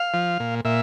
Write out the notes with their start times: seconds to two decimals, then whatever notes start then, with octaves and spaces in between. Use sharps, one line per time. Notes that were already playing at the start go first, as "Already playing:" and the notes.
Already playing: F5
0.14 F3
0.40 A#2
0.65 A#2 E5